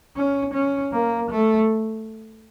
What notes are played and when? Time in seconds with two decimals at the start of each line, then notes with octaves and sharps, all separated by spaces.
0.17 C#4
0.53 C#4
0.92 A#3
1.30 A3